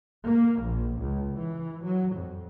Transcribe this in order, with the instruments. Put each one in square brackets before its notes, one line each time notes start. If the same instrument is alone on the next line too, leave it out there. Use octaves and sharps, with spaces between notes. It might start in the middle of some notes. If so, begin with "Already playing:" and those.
[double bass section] A#3
A#1
C#2
E3
F#3
F2